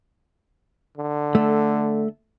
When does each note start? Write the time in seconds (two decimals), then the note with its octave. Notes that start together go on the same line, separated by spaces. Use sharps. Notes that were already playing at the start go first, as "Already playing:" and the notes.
0.97 D3
1.35 A3